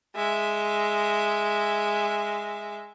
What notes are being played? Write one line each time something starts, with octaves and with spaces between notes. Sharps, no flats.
G#3 E5